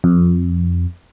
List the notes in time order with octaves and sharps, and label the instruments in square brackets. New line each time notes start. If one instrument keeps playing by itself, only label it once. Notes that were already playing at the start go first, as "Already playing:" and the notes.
[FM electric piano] F2